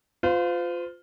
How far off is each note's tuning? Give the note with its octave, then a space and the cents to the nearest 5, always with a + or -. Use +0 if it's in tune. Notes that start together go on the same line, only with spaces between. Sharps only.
F4 +10 C5 -40